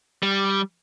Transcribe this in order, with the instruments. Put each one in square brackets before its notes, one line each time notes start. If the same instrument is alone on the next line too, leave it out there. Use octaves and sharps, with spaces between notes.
[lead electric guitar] G3